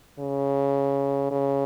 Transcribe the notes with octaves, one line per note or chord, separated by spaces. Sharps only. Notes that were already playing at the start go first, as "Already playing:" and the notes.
C#3
C#3